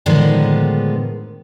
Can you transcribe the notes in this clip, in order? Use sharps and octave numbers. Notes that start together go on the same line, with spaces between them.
A2 D3 D#3 F3 G#3 B3